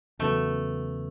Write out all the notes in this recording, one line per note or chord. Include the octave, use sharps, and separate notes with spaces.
E2 C#3 F#3 A3 B3